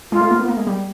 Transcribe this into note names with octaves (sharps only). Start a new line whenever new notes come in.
G#3 F4
A3
A#3
B3
A#3
G#3
G3